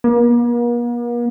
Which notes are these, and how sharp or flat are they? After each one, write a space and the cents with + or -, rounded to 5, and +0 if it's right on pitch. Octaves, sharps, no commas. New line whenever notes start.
A#3 +45